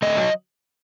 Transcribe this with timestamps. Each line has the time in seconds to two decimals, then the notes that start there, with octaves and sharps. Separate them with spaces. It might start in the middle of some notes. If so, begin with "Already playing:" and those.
0.02 A3 D#5
0.17 F#3